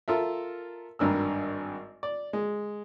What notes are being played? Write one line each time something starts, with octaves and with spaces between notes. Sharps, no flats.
F4 A4 A#4 E5
G#1 G2 A#4 E6
D5
G#3